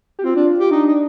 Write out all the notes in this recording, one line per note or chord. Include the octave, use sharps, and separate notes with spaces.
G4
C4 F4
D4
G4
D4 D#4
D#4